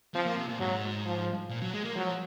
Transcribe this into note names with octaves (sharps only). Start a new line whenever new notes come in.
F3 C4
A#3
C3
A#2
G#2 F#3
F3
A#2
F#3
G#3
A#3
F3 F#3